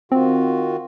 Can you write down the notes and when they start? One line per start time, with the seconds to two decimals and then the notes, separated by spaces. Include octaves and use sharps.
0.12 D#3 C4 F4 F#4